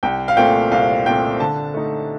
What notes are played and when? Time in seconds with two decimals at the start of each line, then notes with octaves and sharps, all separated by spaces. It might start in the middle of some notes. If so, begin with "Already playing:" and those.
0.03 C2 G5
0.28 F5
0.37 A#2 A3 C4 G5
0.71 C2 F5
1.06 A#2 A3 C4 G5
1.40 D3 A5
1.74 A3 D#4